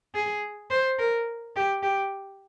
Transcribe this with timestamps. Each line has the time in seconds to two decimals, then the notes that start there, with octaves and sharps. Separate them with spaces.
0.14 G#4
0.70 C5
0.98 A#4
1.56 G4
1.83 G4